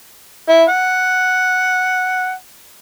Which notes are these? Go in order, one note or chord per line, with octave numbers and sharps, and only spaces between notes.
E4
F#5